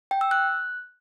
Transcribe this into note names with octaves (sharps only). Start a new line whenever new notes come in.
G5
E6
F#6